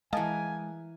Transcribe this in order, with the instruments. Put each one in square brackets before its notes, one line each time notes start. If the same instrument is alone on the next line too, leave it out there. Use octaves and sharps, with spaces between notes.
[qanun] E3 A#4 [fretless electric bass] G#3 [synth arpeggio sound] D#5 F5 A5 [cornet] G#5